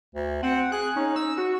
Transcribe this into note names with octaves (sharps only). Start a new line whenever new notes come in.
D2
C4 F#5
G#4 F#6
C#4 D#4
E6
F#4